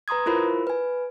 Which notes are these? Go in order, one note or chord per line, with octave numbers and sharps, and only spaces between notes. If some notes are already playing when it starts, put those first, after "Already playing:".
B4 A#5 C6 D#6 G#6
E4 F4 A#4 C5 B5
B4 G#5